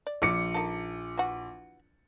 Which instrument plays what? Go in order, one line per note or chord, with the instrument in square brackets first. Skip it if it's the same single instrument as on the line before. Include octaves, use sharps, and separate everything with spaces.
[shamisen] D5
[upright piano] A#1 D6 C#7
[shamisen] D#3 A4
E3 F#4